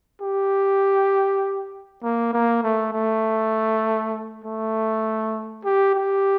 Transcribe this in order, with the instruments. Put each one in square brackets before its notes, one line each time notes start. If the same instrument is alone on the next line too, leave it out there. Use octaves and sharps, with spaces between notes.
[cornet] G4
A#3
A#3
A3
A3
A3
G4
G4